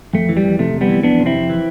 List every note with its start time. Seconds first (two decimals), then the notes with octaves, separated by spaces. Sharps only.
0.13 F2 A3
0.29 E3
0.37 G3
0.43 F2
0.59 C3 A3
0.74 F2
0.81 G3 B3
0.89 E3
1.03 F2 B3 D4
1.19 C3
1.26 C4 E4
1.34 F2
1.50 E3